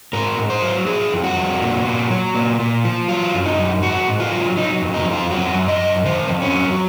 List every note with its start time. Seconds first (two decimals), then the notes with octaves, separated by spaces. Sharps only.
0.13 G#2 A#4
0.38 G#2
0.50 C5
0.62 F#3
0.86 F3 G#4
1.12 F2
1.24 F#4
1.37 F2
1.61 A#2
1.86 A#2
2.10 F#3
2.35 A#2
2.59 A#2
2.84 F3
3.08 F#3 F4
3.34 F#2
3.46 D#4
3.58 F#2
3.82 G#2 F#4
4.08 G#2
4.20 F4
4.32 F#3
4.56 F#3 D#4
4.82 F2
4.94 D#4
5.06 F2
5.12 F4
5.31 F#3 F#4
5.55 F#2
5.68 D#5
5.81 F#2
6.05 D#3 C5
6.29 F2
6.42 C#4
6.54 F#3